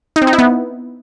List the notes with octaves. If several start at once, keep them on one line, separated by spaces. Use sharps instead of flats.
D#4
C4
D#4
E4
B3